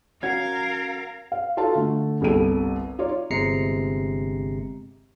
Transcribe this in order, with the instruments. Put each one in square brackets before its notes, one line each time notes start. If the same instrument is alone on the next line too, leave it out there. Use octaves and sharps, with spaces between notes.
[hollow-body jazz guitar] C#4 F#4 [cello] A#4 F5 [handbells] G#6
[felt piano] F5
D#4 F4 F#4 A4 F5 A5
D3 A3
G1 C2 G3 A4 D#7
D#4 F4 C#5 D5
[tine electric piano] G1 C3 G#3 A#5 C7 C#7